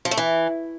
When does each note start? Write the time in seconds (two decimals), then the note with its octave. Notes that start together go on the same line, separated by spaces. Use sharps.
0.05 F3
0.11 A3
0.17 E3